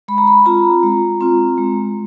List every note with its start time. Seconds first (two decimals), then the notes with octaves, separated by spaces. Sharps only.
0.08 G#3 B5
0.18 A#5
0.28 B5
0.46 C4 F4 A#5
0.83 G#3
1.21 C4 F4
1.58 G#3